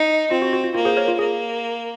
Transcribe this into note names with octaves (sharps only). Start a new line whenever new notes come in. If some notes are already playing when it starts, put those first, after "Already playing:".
Already playing: D#4
C4 F4
F#4
F#4
F4
A#3 F4
G#4 C5
A#4 C#5
F4
A#3 G#4